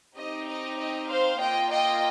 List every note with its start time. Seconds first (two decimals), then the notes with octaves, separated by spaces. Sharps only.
0.16 C4 D#4 G4 D#5
0.47 D#5
0.78 D#5
1.08 C5 F5
1.40 A#3 F4 D#5 G5
1.71 D#5 G5